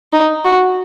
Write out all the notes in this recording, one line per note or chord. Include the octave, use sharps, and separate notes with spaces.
D#4
F#4